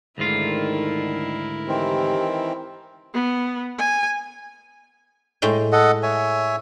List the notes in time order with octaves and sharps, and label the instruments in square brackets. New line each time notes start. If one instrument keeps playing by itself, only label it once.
[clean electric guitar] D2 G#2 F4 [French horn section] D3 D#3 [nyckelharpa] E4 A#4
[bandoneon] D#3 E3 C4 [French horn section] G4
[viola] B3
G#5
[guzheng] A2 G#3 G5
[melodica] A4 D#5 F#5
C#5 E5 G#5